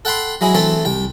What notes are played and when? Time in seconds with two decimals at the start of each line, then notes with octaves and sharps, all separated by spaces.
0.05 A4 F#5 G5 B5 C6
0.41 F#3 G#3 E4 G#4
0.54 E3 A3 C4 A4
0.85 C2 G5